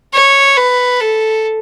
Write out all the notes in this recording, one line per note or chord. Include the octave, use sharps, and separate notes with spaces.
C#5
B4
A4